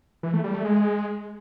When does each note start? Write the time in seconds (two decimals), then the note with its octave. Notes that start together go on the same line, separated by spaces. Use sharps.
0.23 E3
0.34 A3
0.44 G3
0.54 A3
0.65 G#3